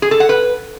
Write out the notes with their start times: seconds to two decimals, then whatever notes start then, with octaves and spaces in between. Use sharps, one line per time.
0.02 G#4
0.11 A4
0.20 F#5
0.29 B4